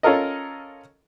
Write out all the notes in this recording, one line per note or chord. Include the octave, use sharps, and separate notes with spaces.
C#4 F4 A4 A#4 D#5